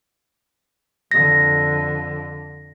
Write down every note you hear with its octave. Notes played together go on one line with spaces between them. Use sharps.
F2 D3 A#6